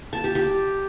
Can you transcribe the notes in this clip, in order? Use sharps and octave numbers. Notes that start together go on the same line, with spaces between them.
A5
G4
G4